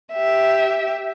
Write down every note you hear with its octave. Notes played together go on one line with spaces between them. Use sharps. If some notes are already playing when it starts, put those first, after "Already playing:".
G4 E5